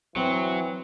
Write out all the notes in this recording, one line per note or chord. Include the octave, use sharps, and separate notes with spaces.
E3 F#3 C4